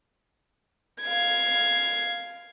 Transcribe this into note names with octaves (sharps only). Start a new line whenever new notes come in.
F5 G#6